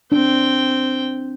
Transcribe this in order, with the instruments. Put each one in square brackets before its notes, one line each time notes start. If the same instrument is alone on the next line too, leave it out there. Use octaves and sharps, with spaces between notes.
[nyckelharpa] C4 G5 [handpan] D4